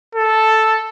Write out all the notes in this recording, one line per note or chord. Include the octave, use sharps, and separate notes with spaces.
A4